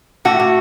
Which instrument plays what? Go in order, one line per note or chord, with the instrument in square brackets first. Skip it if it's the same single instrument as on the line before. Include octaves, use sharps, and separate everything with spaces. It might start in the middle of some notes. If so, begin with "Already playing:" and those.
[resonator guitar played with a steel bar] A2 F#4
A2